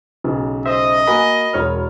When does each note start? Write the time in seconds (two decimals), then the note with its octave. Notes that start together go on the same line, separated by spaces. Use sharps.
0.24 B1 C#3
0.66 C5 D#5 E5
1.07 A#3 F#4 A#4 G#5 B5
1.53 E1 C#5 F6